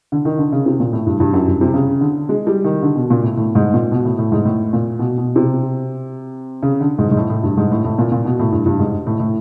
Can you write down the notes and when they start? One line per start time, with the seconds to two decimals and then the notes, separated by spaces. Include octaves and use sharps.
0.12 D3
0.25 D#3
0.39 D3
0.53 C#3
0.66 C3
0.80 A#2
0.93 A2
1.06 G2
1.20 G2
1.33 F#2
1.48 G2
1.61 C3
1.74 C#3
2.01 D3
2.29 G#3
2.47 G3
2.64 D#3
2.83 D3
2.96 B2
3.10 A#2
3.23 A2
3.37 A2
3.55 G#2
3.74 A#2
3.92 B2
4.05 A2
4.19 A2
4.32 G#2
4.45 A2
4.73 A#2
4.99 B2
5.18 B2
5.36 C3
6.63 C#3
6.81 D3
6.98 G#2
7.11 G#2
7.17 A2
7.30 A2
7.43 G2
7.57 G#2
7.71 A2
7.85 A2
7.99 A#2
8.12 A#2
8.25 B2
8.39 A2
8.52 G2
8.66 G2
8.79 G#2
9.07 A2
9.20 A2